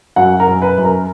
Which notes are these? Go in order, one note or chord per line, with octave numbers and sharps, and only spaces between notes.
F#2 F#4 F#5
A#4
F#2
B4
F#2
A#4